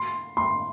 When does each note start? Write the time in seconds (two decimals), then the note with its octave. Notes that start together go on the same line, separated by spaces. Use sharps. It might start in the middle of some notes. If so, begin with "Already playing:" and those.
Already playing: C6
0.37 C6